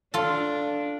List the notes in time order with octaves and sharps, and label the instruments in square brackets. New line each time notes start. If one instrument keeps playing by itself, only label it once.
[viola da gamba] D4 [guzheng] F4 A4